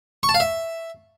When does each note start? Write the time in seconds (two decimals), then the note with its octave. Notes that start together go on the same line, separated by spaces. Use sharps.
0.23 C#6
0.29 A5
0.34 F5
0.40 E5